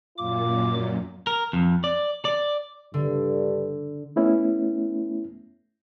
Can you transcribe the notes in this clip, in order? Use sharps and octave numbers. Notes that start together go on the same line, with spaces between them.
F#2 A#2 F4 D6
A#4
F2
D5
D5
G2 D3
A3 B3 C#4 E4